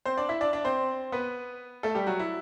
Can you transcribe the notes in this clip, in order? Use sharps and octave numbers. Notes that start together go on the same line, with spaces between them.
C4 C5
D4 D5
E4 E5
D4 D5
D4 D5
C4 C5
B3 B4
A3 A4
G3 G4
F#3 F#4
E4